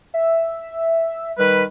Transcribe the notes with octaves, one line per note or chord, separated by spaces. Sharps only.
E5
D#3 G3 B4